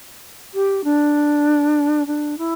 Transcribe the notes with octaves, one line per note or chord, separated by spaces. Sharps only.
G4
D4
D4
E4